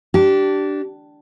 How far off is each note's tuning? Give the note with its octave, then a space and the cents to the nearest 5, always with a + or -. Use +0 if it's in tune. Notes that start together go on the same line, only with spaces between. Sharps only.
D4 +0 G4 -25